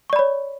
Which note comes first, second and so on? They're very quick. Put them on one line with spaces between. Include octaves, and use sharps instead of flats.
C#6 D5 B5 C#5